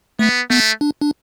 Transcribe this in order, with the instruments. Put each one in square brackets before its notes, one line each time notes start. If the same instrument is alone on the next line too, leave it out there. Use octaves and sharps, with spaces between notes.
[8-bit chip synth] A3 [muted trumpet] B3
[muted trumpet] A3 [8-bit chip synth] B3
[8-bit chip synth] D4
D4